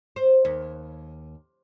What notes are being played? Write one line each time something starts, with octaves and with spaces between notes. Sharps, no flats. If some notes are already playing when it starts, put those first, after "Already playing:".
C5
D#2